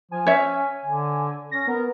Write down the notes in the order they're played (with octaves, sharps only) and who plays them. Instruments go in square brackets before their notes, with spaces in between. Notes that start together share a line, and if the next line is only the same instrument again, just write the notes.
[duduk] F3 [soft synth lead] G#5
[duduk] C#4 [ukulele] C#5 E5
[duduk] D3
[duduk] C#4 [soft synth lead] A#6
[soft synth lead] B3 [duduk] A#4